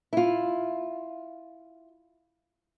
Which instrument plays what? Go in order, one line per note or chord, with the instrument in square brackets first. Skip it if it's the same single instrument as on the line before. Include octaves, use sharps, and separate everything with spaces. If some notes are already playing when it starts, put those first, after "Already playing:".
[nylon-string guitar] E4 F4